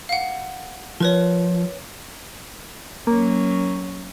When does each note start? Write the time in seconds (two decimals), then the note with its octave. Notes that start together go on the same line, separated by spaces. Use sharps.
0.09 F5 F#5
1.00 F3 A#4 B4 C#5
3.07 F#3 A#3 C#4